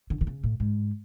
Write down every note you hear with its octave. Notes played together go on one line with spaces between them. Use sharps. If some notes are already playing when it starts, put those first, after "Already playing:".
D3
D3
C#3
A2
G#2